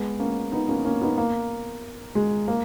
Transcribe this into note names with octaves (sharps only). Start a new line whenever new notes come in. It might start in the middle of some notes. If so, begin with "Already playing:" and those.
Already playing: G#3 B3
A#3 C#4
B3 D#4
A#3 C#4
A#3 C#4
B3 D#4
A#3
G#3
A#3